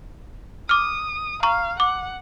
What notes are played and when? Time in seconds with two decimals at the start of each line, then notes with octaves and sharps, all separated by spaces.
0.69 D6 D#6 F6
1.43 F5 A#5 C#6
1.80 F#5 D6